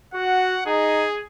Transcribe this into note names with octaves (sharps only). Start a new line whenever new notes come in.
F#4 F#5
D#4 G#4